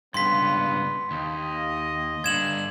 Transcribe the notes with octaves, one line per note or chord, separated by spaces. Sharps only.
C#2 G2 B3 C6 B6
D#2 D#5
G2 D3 G#6 E7 F#7